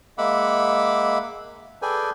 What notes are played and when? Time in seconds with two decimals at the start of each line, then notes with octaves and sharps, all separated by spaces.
0.18 G#3 A#3 E5 F#5 B5 D6
1.82 G#4 A4 B4 D5 G5 G#5